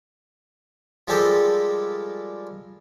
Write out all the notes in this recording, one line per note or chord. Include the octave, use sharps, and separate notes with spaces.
F3 G3 G#3 G4 A4 A#4